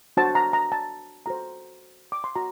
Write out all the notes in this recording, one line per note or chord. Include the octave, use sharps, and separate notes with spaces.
D4 F#4 C5 A5
A#5
A#5
A5
F#4 A4 C5 A#5
D6
C6
F#4 A#5